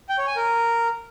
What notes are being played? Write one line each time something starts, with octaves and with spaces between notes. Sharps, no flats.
G5
C#5
G#5
A#4